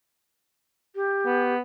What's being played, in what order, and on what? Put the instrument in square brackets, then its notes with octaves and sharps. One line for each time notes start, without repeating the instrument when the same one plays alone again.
[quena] G4
[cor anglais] B3